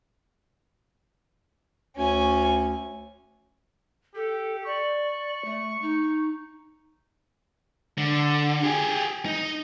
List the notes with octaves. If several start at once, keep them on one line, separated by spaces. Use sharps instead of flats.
D2 C#4 G#5
G4 A4
D5 C#6
A3
D#4
D3
G4 G#4
D#4